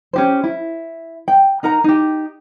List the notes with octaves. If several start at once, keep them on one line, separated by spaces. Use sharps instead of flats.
C#4 G4 C5
E4
G5
D#4 A#4 F#5 A#5
D#4 G4